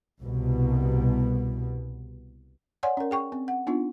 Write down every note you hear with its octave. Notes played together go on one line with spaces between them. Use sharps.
C2 B2
C#5 D5 F#5 G#5 C6
C#4 A#4
G#4 G5 C#6
C4
F#5
B3 D4 D#4 F4